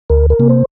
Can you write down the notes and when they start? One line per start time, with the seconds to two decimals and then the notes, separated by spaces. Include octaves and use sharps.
0.10 D2 A#4
0.30 A#4
0.39 C3 A#3
0.49 C5